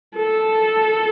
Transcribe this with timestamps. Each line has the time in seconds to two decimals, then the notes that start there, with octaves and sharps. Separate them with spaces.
0.16 A4